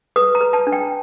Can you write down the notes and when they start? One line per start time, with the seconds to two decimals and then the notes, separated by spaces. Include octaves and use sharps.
0.16 B4 D#6
0.35 A#5
0.41 B4
0.53 A5
0.67 D4
0.72 G5